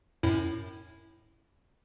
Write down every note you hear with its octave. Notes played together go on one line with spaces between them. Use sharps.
F#2 A2 E4